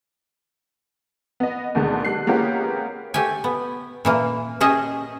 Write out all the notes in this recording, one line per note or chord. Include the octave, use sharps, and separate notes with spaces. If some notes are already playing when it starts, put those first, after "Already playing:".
B3 D#5
D2 B2 D3 D#3 G#3 A3
G3 F#6 C7
G#3 A#3 B3 C#4 G4 A#4
A3 G4 G#5
B3
A#2 E3 A#3
C#4 G4 G#4 D#5 E5